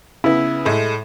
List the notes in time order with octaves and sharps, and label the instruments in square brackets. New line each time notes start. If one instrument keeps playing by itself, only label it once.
[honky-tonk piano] C#3 B3 [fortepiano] E4
[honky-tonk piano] A2 G#3 A3